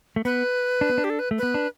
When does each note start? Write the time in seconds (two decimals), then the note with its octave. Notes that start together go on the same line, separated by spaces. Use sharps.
0.16 A3
0.25 B3 B4
0.81 D4
0.90 B3
0.98 D4
1.04 G4
1.10 A4
1.19 B4
1.31 A3
1.38 B3 B4
1.54 D4